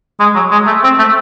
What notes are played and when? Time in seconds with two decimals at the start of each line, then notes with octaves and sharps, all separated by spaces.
0.20 G#3
0.35 F#3
0.51 G#3
0.67 A3
0.84 C4
0.99 A3